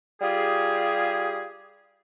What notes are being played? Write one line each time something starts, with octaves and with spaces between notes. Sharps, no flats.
G3 F4 G4 G#4